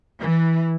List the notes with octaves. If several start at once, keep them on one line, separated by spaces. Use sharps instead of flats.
E3